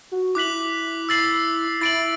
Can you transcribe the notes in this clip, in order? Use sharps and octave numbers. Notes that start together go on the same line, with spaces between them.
F#4
E4 D6 F#6 B6 F#7
E6 A6 C7 F#7
E4 A6 D7 F#7